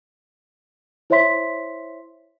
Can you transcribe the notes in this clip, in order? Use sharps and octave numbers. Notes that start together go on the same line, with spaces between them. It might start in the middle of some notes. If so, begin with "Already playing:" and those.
E4 C5 C#5 E5 C6 B6